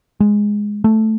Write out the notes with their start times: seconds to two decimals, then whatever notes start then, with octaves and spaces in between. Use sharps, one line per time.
0.20 G#3
0.84 A3